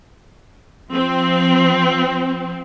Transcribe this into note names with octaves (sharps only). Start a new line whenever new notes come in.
F3 C4